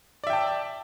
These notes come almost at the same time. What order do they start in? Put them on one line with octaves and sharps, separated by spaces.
D5 E5 G5 A5